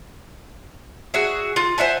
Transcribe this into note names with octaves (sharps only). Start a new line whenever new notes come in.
F#4 G#4 E5
F4
C5 E5 F#5 G#5